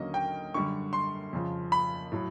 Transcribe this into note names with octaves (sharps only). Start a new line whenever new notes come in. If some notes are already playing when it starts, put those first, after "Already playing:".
Already playing: D#2 D3 F#3 A#3 C#4 D#5
G5
F#2 D3 G3 C#6
C6
F2 C#3 F3
B5
A2 F#3